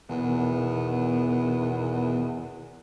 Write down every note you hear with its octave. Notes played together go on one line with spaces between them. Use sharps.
E2 B2 D#3 B3